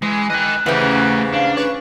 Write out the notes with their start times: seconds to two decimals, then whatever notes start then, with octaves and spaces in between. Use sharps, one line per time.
0.02 E3 G#3
0.30 E3 D#5 G5 F#6
0.66 G#2 C#3 E3 A3 G4 F#5
1.33 D4 F5
1.57 B4 C#5